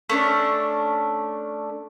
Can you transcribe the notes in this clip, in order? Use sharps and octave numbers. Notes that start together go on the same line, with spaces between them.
A3 C#4 D4